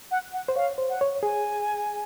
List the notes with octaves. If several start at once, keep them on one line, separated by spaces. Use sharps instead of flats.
F#5
F#5
C5
C#5 F5
C5
F#5
C#5
G#4 G#5